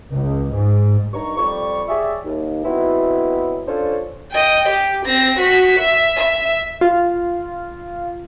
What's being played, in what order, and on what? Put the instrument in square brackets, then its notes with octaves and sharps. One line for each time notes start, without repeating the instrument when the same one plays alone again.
[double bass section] C#2
G#2
[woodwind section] G2 D#3 A#5 C#6
F2 G3 D5 C#6
G4 G#4 C#5 D5 E5
D#2
B2 F#3 B3 C4 E4
C#4 D4 F4 A4 C5 C#5
[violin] D#5 G5
G4
C4 A#6
F#4 B6
E5
E5
[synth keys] F4